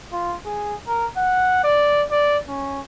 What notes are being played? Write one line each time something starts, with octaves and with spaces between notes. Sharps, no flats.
F4
G#4
A#4
F#5
D5
D5
C#4